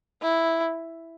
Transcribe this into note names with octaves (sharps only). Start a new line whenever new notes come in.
E4